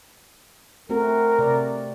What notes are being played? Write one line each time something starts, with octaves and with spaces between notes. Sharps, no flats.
A3 C4 F#4 A#4
C3 D5